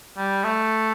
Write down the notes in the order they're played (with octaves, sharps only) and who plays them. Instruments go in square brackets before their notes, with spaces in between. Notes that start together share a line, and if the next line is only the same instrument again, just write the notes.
[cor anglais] G3
A3